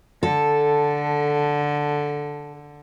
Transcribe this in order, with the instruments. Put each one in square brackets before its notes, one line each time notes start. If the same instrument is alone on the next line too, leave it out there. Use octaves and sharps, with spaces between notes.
[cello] D3 [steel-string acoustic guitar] A4